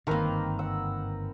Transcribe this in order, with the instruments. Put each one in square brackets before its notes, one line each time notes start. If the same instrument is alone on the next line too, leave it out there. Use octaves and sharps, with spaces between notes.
[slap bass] G1 G#2 [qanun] D#3 A#3 [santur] C4 A#4 B4
[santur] F#5 E6